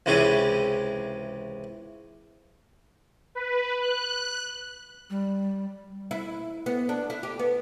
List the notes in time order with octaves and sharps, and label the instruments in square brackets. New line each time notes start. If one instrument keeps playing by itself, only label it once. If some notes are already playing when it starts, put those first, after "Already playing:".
[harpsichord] C#2 C3 E3 C#4 G#4
[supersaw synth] B4
F#6
[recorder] G3
[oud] E4
B3
D4
E4
G4
B3